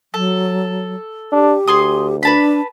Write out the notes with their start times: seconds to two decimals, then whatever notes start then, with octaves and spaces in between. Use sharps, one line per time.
0.14 F#3 A4
1.32 D4 G4
1.67 D2 G#4 C6 D#6
2.23 D4 B4 A5 B5